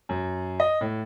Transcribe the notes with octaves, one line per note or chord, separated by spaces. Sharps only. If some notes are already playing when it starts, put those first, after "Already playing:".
F#2
D#5
A2